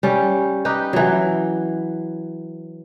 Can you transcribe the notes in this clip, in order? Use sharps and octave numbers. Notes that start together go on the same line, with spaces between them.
G3 C#4
D#4 G4 B4
E3 F#3